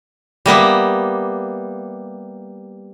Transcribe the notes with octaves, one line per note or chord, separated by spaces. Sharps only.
G3 A#3 B3 E5